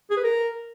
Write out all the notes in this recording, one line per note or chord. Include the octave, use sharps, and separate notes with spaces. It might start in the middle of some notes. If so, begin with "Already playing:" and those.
G#4
B4
A#4